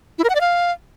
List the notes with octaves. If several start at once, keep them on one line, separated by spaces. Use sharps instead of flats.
E4
A#4
F#5
D5
F5